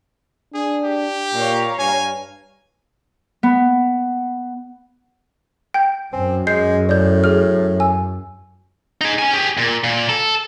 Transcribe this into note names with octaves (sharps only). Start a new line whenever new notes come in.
D4 G#4
G4
A#2 C#5 F5 A#5
G2 G#5
B3
G5 G6
F#2 C4 G#5
G#3 G6 C7
A2 D5 G6
G#4 F6
G#5 E6
D#4 G#4
C#4 G#5
G4 G#4
A#2
A#2
A4